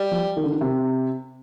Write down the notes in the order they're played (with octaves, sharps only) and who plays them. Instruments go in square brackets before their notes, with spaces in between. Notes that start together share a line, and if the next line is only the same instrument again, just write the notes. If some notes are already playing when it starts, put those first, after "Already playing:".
Already playing: [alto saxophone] G3
[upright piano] F3
D#3
D3
D#3
C3